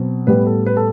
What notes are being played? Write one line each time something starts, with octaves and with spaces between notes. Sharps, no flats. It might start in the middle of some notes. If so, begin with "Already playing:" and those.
Already playing: B2 F#3 C4
A2 G3 B3 B4
A4
B4
A4